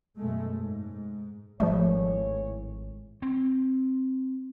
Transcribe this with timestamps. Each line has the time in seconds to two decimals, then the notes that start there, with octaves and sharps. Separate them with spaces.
0.17 F#2 B2 G#3 A3
0.59 G#2
1.60 G#1 A2 E3 F3 G3 A3 E4 C#5
3.22 C4